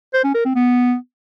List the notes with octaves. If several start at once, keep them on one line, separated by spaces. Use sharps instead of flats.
C5
C#4
A#4
C4
B3